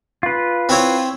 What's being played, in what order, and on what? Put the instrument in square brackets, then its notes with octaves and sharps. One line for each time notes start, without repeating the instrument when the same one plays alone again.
[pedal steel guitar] F4 B4
[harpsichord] C4 E4 C#5